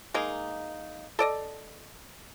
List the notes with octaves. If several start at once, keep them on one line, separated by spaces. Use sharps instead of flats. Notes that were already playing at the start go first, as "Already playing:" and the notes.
G#3 A#3 D#4
A4 D5 D#5